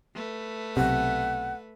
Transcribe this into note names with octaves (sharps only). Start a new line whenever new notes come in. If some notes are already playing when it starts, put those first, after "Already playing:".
A3 B4
B1 C3 F#5